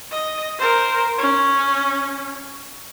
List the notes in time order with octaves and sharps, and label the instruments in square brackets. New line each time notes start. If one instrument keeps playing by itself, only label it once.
[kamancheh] D#5
A#4 C5
C#4